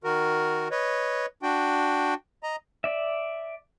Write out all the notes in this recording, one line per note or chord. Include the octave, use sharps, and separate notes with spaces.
D#3 F#4 A#4
B4 C#5 D#5
D4 F#4 G5
D#5 A#5
D5 E5